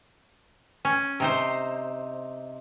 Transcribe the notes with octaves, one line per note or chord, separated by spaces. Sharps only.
C#4
C3 D#4 C5